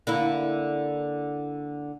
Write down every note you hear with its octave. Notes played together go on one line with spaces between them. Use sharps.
D3 A#3 E4